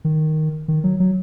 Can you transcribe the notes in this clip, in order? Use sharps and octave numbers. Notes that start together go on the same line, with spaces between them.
D#3
D#3
F#3
F#3